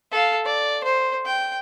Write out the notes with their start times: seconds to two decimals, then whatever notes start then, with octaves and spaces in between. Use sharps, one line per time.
0.12 A4 F5
0.46 D5
0.84 C5
1.25 G5